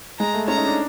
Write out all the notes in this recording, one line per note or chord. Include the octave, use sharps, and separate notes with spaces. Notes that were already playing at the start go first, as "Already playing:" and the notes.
G#3 A#5
A3
C#4 A#5
D#4
D4